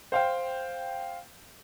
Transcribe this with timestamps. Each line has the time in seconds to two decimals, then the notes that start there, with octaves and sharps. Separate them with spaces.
0.12 C5 F5 G5